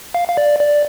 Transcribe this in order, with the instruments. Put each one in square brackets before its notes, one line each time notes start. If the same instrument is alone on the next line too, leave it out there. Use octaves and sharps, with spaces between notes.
[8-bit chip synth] F5
F5
D5
D5